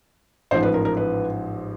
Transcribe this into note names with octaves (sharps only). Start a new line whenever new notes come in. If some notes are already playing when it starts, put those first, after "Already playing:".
A1 G#2 F3 C5
B4
A#4
A#4
B4